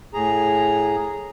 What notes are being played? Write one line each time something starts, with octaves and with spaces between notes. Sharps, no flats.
A2 G#4 A#5